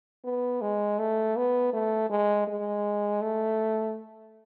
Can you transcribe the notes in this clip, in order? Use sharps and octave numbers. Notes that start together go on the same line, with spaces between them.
B3
G#3
A3
B3
A3
G#3
G#3
A3